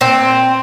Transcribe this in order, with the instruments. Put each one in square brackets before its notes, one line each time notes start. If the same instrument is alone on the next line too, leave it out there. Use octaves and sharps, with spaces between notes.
[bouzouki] A#2 C4